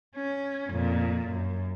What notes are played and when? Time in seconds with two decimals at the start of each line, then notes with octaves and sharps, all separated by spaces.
0.16 C#4
0.71 F2 A#2
1.27 F#2